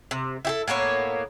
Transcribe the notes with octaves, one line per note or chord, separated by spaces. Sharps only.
C3
E4 G4 A4
A2 A#3 B3 C#5